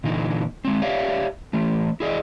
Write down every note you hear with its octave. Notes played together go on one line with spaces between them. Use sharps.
A#2 D3 E3 D#4
G#3 C4
G4 C#5 D5 E5 F5
E3 A3
E4 G#4 D5 D#5